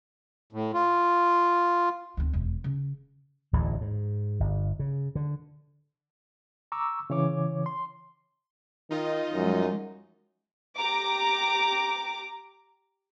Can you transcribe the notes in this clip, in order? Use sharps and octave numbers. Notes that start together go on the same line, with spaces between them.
A2
F4
D2 C4
E1
C#3
D1 A1 D#2 A2
G#2
G1
C#3
D3
A#5 C#6 D6 E6
C#3 E3 C#5 D6
C6
D#3 D#4 F4 D#5
F#2 F3 G3 G#3
G4 A#5 D6